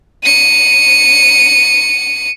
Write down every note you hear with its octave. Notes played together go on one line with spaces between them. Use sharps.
C#7 D#7